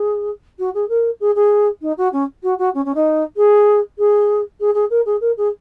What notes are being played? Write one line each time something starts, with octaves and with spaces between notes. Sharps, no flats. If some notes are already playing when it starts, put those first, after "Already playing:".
Already playing: G#4
F#4
G#4
A#4
G#4
G#4
D#4
F#4
C#4
F#4
F#4
C#4
C#4
D#4
G#4
G#4
G#4
G#4
A#4
G#4
A#4
G#4